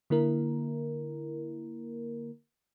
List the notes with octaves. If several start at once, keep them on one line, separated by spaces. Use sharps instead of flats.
D3 A#3 E4 A#4